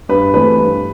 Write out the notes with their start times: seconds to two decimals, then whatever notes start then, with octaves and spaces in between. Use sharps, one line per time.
0.09 G2 B4
0.34 E3 A3 C4 B4
0.58 G2